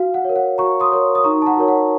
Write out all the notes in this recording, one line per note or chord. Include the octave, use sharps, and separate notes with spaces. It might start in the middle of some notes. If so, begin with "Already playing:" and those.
Already playing: F#4 F5
F#5
A#4 C#5
F#5
F#4 A#5 C#6
C6 D#6
A#4 C#5
D#6
D#4 A#5 C#6
A5
F#5 A#5
F#4 A#4 C#5
F#5